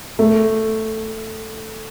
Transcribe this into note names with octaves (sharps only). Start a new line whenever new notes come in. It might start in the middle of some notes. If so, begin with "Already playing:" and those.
A3